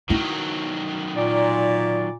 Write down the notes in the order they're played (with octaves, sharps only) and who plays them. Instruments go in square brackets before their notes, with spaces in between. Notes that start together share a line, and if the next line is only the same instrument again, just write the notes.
[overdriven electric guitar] D#3 F#3 [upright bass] E4
[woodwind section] A#2 D5